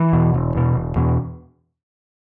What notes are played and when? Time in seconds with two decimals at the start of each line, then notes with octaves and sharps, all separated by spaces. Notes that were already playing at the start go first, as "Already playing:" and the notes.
Already playing: E3
0.13 E2 B2
0.34 E1
0.55 E2 B2
0.76 E1
0.96 E2 B2